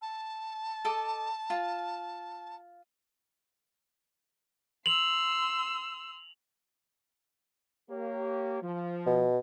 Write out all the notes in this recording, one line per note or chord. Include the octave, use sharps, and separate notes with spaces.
A5
A4 D#5 D6
F4
C6 E6 F7 F#7
A#3 G4 C#5
F3
B2